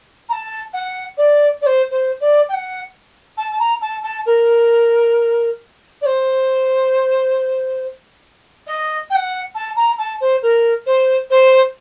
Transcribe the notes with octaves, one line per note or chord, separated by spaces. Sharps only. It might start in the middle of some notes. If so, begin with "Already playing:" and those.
A#5
A5
F#5
D5
D5
C5
C5
D5
G5
F#5
A5
A5
A#5
A5
A5
A#4
D5
C5
D#5
G5
F#5
A5
A#5
A5
C5
A#4
C5
C5